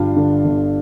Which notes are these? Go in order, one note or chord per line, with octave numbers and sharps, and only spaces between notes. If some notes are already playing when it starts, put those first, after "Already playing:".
Already playing: G1 G2 D4 F4
D3
G1